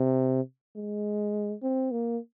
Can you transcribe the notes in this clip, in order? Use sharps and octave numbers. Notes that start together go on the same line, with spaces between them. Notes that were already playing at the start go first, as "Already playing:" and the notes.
Already playing: C3
G#3
C4
A#3